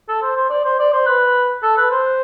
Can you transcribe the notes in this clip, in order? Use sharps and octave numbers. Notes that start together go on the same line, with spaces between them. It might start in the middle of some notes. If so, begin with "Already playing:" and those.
A4
C5
C5
D5
C5
D5
C5
B4
A4
B4
C5